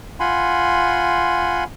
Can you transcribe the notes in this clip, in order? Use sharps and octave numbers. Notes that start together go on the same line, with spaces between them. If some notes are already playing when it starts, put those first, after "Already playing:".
F4 F#5 G#5 B5 C6